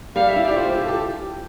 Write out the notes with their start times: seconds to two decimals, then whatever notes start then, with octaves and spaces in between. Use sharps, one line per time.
0.16 G3 F5
0.29 E5
0.36 E4
0.44 G4 D5
0.56 F4 C5
0.67 E4 G4
0.78 F4
0.85 G4 A4